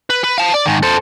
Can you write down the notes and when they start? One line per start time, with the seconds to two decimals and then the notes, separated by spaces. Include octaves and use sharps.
0.10 B4
0.24 B4
0.38 F5 A5
0.54 D5
0.66 G#2 D#3
0.83 A4 C5